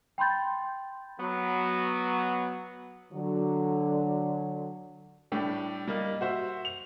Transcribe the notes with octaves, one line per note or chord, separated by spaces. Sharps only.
G5 B5 C6 G6 A6
F#3 B3
D3 F#3
A2 G3 D4 G4
G3 A#3 D#5
F#4 C5 E5
F7